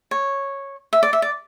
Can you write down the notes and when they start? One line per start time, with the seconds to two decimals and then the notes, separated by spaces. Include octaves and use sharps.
0.11 C#5
0.93 E5
1.03 D5
1.13 E5
1.22 D5